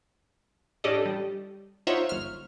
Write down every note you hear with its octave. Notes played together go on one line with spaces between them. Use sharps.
A2 C#4 D4 G4 A4 D#5
G3
D#4 F4 C5 C#5 E5 F#5
G1 F6